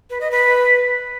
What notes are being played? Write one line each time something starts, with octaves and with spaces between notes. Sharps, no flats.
B4
D#5
B4